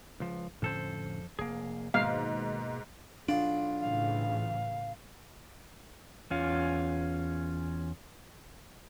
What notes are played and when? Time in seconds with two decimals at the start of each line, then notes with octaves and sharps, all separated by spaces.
0.20 C#2 F3
0.62 F2 A2 D3 C#4 A4 C5
1.39 F1 A#3 G#4
1.94 G#2 B2 D#3 A#3 F5
3.28 B1 D4 F4
3.80 A2 C#3 E3 F5
6.30 E2 C#4 F4